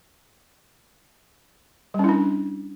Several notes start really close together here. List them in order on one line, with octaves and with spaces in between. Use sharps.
G3 C#4 E4 D4